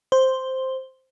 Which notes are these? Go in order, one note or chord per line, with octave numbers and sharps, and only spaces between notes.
C5